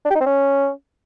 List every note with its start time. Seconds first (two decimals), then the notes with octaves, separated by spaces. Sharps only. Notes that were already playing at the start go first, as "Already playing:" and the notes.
0.05 D4
0.10 G4
0.16 D#4
0.21 C4
0.26 C#4